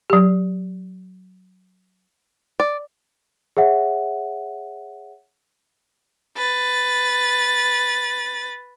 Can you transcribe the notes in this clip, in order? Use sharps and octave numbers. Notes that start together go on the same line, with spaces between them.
F#3 G4
D5
G#4 C#5 E5 F#5
B4 A6